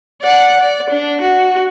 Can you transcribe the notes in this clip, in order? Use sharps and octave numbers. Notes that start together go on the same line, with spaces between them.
D5 F#5
D5
D4
F#4